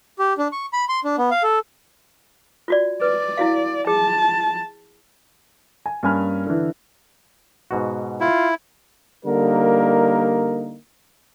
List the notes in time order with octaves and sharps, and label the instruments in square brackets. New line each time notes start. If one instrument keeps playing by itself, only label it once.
[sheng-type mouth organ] G4
D4
C#6
B5
C6
D4
B3
F5
A4
[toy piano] F4 F#4 D5
[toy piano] B4 [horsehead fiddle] D5
[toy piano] E4 F#4 F5
[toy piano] G#4 [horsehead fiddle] A5
[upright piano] G#5
G2 A#3 C#4 G#5 B5 F6
D3 E3
[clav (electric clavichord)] G#2 B2 F#4
[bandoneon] E4 [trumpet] F4
[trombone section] D3 G3 A#3 D#4 A#4